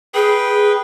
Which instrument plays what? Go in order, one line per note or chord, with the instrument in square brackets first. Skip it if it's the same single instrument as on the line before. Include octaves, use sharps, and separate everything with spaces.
[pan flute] G#4 [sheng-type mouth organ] B4 G5